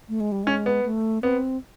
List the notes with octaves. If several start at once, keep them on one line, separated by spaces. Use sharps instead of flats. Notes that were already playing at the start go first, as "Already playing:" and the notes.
A3
G#3
G3
G#3 C#4
B3
A3
B3 C4